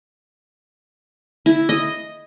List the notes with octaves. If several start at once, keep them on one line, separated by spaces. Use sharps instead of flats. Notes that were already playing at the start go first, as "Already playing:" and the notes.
E4
D#5